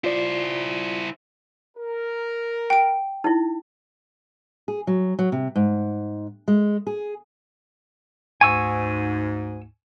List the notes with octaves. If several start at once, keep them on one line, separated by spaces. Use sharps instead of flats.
E4 F4 C5 D5
A#4
G5 D7
D#4 E4
G#4
F#3
F#3
C3
G#2
G#3
G#4
D2 G#2 G#5 C#6 E6